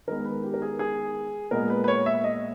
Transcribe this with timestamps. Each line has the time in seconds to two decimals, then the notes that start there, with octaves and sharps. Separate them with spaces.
0.07 D#3 G#3 B3 A#4
0.25 B4
0.43 G4
0.54 A#4
0.62 G#4
0.79 G#4
1.51 A#2 G#3 B3 A#4
1.70 B4
1.84 B4
1.88 C#5
2.06 E5
2.24 D#5